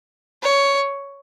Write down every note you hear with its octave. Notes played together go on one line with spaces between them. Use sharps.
C#5